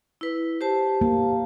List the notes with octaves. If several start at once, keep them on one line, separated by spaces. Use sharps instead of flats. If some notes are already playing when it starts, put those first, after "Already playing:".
E4 B4
G4 C5 A5
A#3